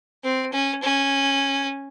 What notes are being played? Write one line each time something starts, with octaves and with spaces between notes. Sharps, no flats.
C4
C#4
C#4